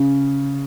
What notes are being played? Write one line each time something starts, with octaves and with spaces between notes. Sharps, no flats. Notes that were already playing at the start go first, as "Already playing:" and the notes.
Already playing: C#3